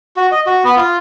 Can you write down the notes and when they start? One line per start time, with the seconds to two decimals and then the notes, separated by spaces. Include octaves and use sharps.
0.17 F#4
0.32 D#5
0.46 F#4
0.64 B3
0.76 F4